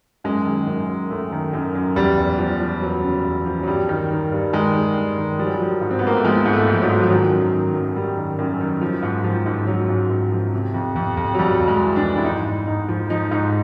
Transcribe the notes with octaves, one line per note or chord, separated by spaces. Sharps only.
F#2 G#3
D#3
F#2
F#2
F#2 A3
D#3
F#2
F#2
E2 G3
E2
F3
F3
E2 F#3
C#3
E2
F3
F#3
G2 G3
D#3
D#3
G2
D#3 G#3
D#3
G2
D#3
F3 G3
F#3
G3
F3
G#2
C4
B3
G#2 A#3
A3
F3 G#3
G#2
A3
G#2
F3
F#3
G#2
F3
D#3 F#3
F#2
D#3
F#2
F#2 G3
D#3
F#2
D#3
F3
G#2
F3
G#2
F3 F#3
G#2
G#2
F3
C3
F2
F2
F2
F#3
F2 G3
F2
G#3
E3
D4
F2
E4
G#2 D#4
G#2
G#2 D#4
F3
F3 D#4
G#2 D#4